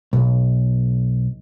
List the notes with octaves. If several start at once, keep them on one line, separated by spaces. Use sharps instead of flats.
B1